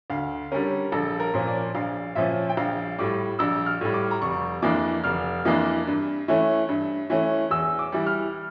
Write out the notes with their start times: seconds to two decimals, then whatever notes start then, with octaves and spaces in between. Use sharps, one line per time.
0.10 D2 F5
0.51 D3 G3 C#4 A#4
0.92 A#1 A4
1.20 A#4
1.34 A#2 F3 C#4
1.47 D5
1.75 A#1 F5
2.15 A#2 F3 C#4 E5
2.49 G5
2.57 A#1 F5
2.98 A2 G3 D6
3.39 A#1 E6
3.66 F6
3.81 A2 G3
3.94 D6
4.11 A#5
4.22 F1 C#6
4.62 F2 E3 A#3 D4 D6
5.04 F1 F6
5.45 F2 E3 A#3 D4
5.87 G2
6.28 E3 A3 C#4
6.69 G2
7.10 E3 A3 C#4
7.50 E2 E6
7.79 D6
7.92 E3 G3
8.07 F6